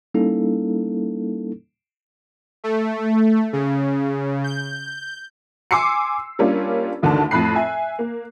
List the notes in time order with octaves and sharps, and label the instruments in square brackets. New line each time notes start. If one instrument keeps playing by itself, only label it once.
[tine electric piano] G3 A#3 C#4 D#4 E4 A4
[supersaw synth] A3
C#3
G6
[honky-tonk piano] G#5 C6 D6 E6 C7 C#7
G3 A#3 C#4 D4 F4
A1 D2 D3 D#3 A5
F2 A2 B5 F#6 C7
E5 G#5
A#3